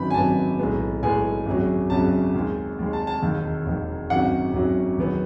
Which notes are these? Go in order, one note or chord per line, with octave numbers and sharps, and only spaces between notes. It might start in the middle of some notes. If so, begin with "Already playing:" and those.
Already playing: G#1 F#2 D#3 F#3 B3 B5
G#5
G#1 F#2 D#3 F#3 B3 A5
B1 A2 G#3 B3
B1 A2 G#3 B3 G#5
G#1 F#2 C#3 F#3
G#1 F#2 C#3 F#3 A5
D#2 D#3 G#3
D#2 D#3 G#3
A5
A5
E1 D#2 D#3
E1 D#2 D#3
G#1 F#2 D#3 F#3 F#5
G#1 F#2 D#3 F#3
E2 D#3 F#3 B3